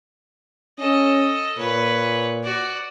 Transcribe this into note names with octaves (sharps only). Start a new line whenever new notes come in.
C#4 A4 D#5
A#2 B4 C#5
F#4 D5